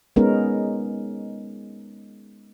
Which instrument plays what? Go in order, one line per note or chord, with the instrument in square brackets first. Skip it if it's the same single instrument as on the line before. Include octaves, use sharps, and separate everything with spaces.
[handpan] G#3 B3 C#4 D#4 A#4